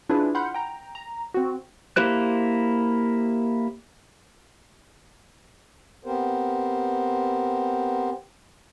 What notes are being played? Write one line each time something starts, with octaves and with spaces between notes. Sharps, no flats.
C#4 D4 E4 F4 G#4 B4
F#5 B5 C6 F6 G6
G5 A#5
A#5
C4 F#4
A#3 E4 G4 C5 F#6
B3 C4 G4 A#4 C5